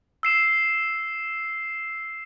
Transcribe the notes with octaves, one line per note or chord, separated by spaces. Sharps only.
E6 C7 E7